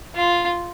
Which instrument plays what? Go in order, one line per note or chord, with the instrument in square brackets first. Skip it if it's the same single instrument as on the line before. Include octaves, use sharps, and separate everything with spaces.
[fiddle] F4